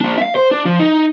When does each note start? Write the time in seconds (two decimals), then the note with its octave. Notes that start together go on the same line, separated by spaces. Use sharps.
0.01 A#3 D4
0.18 E5 F5
0.36 C5
0.51 D4
0.65 F3
0.79 D#4